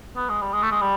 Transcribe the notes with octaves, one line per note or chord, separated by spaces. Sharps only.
B3
G#3
G3
G#3
A3
G#3
G3